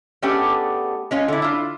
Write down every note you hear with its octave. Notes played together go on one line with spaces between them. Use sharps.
A3 B3 C#4 D4 G4 G#4
G#3 C#4 F4
D3 E4
E4 F4